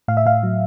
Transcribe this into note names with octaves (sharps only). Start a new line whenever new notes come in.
A2 F5
E5
A2 F5
F#3